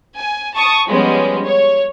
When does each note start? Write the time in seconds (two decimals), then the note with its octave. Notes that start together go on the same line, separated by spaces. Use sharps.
0.17 G#5
0.55 A5 C#6 D#6
0.87 F3 G3 G#3 B3 C#4
1.44 C#5